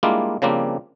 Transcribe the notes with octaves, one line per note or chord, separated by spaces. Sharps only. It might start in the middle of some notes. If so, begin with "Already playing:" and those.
G3 G#3 A#3 D4 E4 F4
C#3 F3 G3 A#3 C4 D4